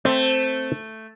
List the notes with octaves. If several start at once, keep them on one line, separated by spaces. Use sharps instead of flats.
A3 C4